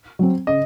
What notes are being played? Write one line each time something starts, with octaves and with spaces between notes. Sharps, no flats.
F#3 C4
C#3 D#5